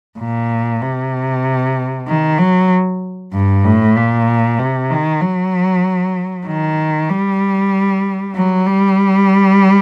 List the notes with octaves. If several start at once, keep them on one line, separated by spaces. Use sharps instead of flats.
A#2
C3
D#3
F#3
G2
A2
A#2
C3
D#3
F#3
D#3
G3
F#3
G3